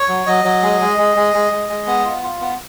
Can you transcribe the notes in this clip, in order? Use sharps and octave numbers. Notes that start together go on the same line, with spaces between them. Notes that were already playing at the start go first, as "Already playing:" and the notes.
Already playing: C#5
F#3
F#3 D#5
F#3
G#3
G#3
G#3
G#3
G#3
G#3
G#3
B3
F4
F4
B3